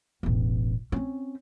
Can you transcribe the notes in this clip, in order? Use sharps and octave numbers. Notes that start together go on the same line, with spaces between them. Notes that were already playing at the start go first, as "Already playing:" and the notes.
E1 A1
C4 C#4